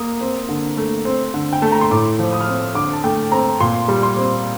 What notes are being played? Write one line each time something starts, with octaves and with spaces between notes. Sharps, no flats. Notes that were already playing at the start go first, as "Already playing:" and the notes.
Already playing: A#3 D#6
C4
D3
A3
C4
D3
G5
A3 A5
A#5
C6
A2 D6
F3
D#6
F6
C4 D#6
D3 D6
A5
A3 G5
C4 A#5
A#2 C6
G3
C6
C4